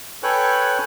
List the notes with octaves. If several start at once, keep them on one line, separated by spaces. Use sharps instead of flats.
A4 B4 C#5 G5 G#5 F#6